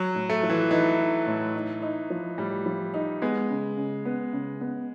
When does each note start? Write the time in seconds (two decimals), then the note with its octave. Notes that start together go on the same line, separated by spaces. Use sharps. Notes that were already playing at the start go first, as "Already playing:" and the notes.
Already playing: F#3
0.15 A2
0.30 A3
0.43 F3
0.50 E3
0.71 E3 D#4
0.99 D#4
1.27 A2
1.54 D#4
1.82 D#4
2.10 F3
2.38 A2 G3
2.66 F3
2.94 D#4
3.22 G#3 B3
3.50 C#3
3.77 C#3
4.05 B3
4.33 C#3
4.61 B3